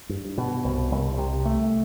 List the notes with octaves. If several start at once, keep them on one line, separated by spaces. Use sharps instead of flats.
G2
B2
C2
C2
C3
A3